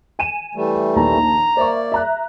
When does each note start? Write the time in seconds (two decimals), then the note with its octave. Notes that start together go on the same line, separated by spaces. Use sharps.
0.19 G#5 D#7 E7
0.55 E3 G3 A3
0.96 A#1 D#2 A5 A#5
1.57 A#3 C5 D5 E5 C#6
1.92 E5 A#5 F#6